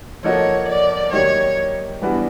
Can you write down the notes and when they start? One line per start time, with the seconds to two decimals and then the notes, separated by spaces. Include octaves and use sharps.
0.24 F3 A#3 D#4 F#4 A4 C#5
0.69 D5
1.13 D#3 F#3 A#3 D#4 G4 C#5
2.01 E3 G3 B3 D4 F#4